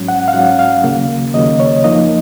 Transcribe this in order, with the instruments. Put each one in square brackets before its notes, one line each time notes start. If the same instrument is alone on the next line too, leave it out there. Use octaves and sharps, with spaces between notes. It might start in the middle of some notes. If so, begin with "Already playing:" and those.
Already playing: [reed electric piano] G#2 F#3 C#4
F#5
F5
G#2 F#3 C#4 F#5
F5
D#2 C#3 F#3 A#3
D#2 C#3 F#3 A#3 D#5
C#5
F2 F3 A#3 D#4 D#5